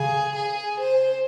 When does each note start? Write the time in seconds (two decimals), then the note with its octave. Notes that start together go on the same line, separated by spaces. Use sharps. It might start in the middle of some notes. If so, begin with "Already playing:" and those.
Already playing: C#3 G#4
0.36 G#4
0.80 C5